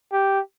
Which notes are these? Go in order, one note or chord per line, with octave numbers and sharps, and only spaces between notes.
G4